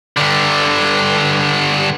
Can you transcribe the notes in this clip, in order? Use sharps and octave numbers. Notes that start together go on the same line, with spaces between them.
G2 D3